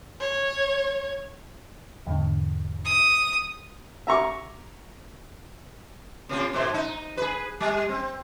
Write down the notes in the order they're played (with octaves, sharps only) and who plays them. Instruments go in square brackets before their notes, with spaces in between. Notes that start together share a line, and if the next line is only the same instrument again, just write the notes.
[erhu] C#5
[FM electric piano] E2 G#2 D3
[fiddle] D#6
[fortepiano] E5 A#5 C#6 D6
[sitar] C3 A#3 F4
G#2 B2 C5
D#4
G#4 B4
G3
C4